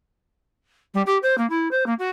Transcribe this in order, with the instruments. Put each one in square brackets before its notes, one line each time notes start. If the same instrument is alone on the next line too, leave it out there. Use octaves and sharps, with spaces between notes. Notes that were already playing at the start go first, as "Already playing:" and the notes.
[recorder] G3
G4
C5
A#3
E4
C5
A#3
F#4